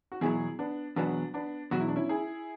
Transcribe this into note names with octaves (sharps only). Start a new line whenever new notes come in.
F#4
E2 B2 F#3 E4 G#4
B3 D4
E2 B2 F#3 B3 D4
B3 D4
E2 B2 F#3 F#4
E4
D4
C#4 E4
E4 G#4